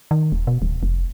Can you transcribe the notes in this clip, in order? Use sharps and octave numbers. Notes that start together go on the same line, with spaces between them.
D#3
D#1
B2
D1
F1